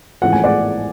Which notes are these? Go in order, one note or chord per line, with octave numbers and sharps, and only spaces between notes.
A1 A2 F3 G#3 F#5
G#5
D5 F#5